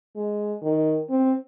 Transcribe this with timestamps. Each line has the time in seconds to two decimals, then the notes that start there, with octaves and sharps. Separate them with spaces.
0.16 G#3
0.62 D#3
1.09 C4